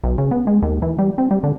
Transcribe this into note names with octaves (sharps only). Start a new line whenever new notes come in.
B1
C#3
B3
G#3
D#2
E3
G3
C4
G3
D3